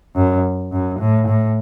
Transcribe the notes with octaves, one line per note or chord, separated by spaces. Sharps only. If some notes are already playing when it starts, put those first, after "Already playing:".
F#2
F#2
A2
A2